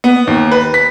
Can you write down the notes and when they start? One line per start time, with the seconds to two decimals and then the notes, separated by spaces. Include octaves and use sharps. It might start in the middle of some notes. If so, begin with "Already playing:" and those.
0.04 B3
0.27 D#2
0.51 B4
0.74 B6